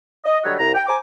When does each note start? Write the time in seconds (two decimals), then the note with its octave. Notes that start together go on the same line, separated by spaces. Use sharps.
0.24 D#5
0.43 D3 F#3 G3 A3 F#4 C#5
0.58 C2 A#5
0.75 G5
0.87 C5 G#5 A#5 D6